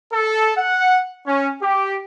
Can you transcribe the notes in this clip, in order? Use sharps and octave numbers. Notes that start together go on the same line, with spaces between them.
A4
F#5
C#4
G4